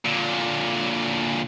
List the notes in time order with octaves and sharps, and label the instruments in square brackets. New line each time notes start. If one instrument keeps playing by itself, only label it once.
[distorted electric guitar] A#2 D3